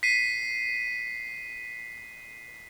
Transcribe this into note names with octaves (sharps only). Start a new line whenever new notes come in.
B6 C7 D#7